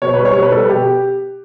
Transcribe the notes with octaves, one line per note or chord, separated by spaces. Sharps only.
B2 C#5
G3 B4
C#5
B2 C#5
B4
G3 A4
B4
B2 G4